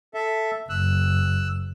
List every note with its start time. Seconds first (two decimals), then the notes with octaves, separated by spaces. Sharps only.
0.14 A4 E5
0.70 F#1 E6 F#6